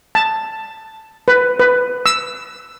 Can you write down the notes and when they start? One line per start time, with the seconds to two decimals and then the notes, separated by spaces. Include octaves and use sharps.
0.15 A5
1.28 B4
1.59 B4
2.06 E6